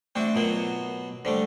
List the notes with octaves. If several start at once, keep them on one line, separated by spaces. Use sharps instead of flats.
A3 C4 D4 F#4 E5
B2 F#3 B3 F4 A#4
D3 G3 A3 C5